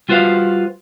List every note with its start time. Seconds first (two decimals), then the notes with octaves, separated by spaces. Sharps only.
0.09 G3 F4 F#4 B4 C5 F5